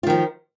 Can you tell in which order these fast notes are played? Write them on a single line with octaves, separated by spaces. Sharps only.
F4 D#3 F3